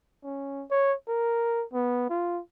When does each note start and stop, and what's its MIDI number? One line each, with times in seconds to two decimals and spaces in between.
0.24 0.65 61
0.71 0.94 73
1.08 1.65 70
1.73 2.08 59
2.10 2.41 65